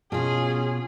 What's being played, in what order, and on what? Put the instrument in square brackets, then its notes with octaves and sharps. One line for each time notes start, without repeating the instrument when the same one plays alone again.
[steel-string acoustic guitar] B2 F4 [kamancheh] C#4 G#4